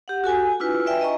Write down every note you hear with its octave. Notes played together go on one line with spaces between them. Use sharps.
G4 F#5
F#4 A4 G#5
D4 E4 F4 B4
B4 D5 E5 G5 G#5
D#5 A#5 C#6